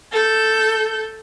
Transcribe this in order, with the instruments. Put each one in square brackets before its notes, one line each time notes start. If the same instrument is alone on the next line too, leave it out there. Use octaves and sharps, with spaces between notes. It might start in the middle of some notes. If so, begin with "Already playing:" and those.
[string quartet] A4 G6